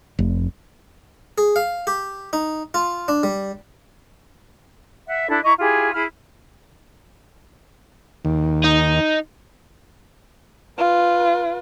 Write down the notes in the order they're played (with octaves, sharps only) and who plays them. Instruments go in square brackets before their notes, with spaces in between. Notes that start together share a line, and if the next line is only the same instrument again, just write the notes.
[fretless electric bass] F1
[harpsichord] G#4
F5
G4
D#4
F4
D4
G3
[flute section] E5 F#5
D4 E4 A4
E4 D#5 A#5 C#6
E4 F4 G4 G#4
E4 G#4 B5 F6
[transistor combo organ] D#2
[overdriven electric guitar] D#4
[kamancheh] F4 B4